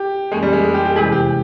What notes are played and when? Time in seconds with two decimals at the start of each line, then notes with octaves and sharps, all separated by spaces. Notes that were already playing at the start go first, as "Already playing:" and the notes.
Already playing: G4
0.31 F2 E3 G#3 A#3 C#4
0.43 G3
0.53 G#3
0.63 G#3
0.74 G4
0.85 G4
0.96 E2 C3 E3 G#3 E4 G#4
1.12 G4